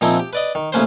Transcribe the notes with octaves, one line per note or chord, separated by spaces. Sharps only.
A#2 F3 A#3 C4 D#4 E4
G4
B4 D5 D#5
D#3
A1 E3 A#3 C#4 B4 C5